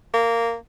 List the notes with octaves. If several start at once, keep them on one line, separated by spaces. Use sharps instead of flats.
A#3